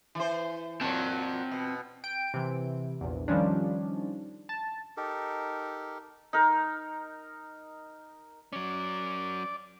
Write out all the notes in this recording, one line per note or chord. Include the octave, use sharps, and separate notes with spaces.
E3 C5
A#2 F#3 C4 A5
B2
G5 D7
C3 E3
A#1 E2
D#3 F3 G3 C#4 D4
A5
D#4 G4 A4 A#4
D#4 A#4
F#3 C#4 D5